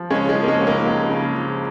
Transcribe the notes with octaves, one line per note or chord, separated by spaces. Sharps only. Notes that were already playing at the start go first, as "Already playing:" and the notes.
Already playing: F3
C#3 G#3 C#4
G#3
F3
A#3
G#3 C#4
C#2
A#3 D#4
C#2
C#3
F3